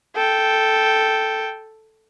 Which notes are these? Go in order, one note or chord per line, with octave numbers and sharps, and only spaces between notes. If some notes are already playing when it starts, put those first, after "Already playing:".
A4 G5